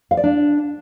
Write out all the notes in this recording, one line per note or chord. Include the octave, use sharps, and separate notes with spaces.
F5
D5
D4